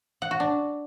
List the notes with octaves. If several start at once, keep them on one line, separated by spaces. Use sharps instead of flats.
F#5
F#4
D4